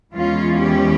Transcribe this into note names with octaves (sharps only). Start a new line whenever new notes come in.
E2 E3 G#3 C#4 F4
G4